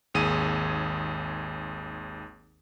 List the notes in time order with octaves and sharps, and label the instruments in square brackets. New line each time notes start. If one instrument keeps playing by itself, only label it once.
[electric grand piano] G#1 D#2 G#4 D#7